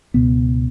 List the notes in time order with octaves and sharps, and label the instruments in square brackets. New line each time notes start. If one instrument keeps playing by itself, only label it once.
[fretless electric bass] C#2 B2 B3